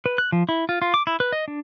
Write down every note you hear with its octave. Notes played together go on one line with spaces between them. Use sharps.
B4
F#6
F3
E4
F4
F4
D6
E4
B4
D#5
D4